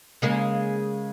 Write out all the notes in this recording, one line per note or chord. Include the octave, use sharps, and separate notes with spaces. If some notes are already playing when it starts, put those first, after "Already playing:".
C#3 G#3 A#3